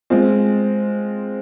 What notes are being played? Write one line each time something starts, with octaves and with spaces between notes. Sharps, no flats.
G#3 C4 F4